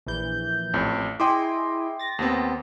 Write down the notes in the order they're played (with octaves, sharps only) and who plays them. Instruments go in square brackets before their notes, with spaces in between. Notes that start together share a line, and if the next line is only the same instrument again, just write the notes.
[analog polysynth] A#1 E3 G6
[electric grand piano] A1 F2
[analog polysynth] E4 G#4 D#5 [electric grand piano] G5 C6 D6
[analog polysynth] A6 A#6
[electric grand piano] D#2 B3 C4